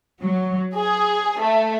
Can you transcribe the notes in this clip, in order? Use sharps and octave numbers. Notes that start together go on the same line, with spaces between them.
F#3
G#4
A3